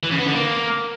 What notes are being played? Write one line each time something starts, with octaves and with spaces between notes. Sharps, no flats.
E3
C#3
B3
D3
A#3